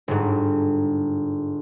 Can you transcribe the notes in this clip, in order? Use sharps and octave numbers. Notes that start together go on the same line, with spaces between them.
G1 G#2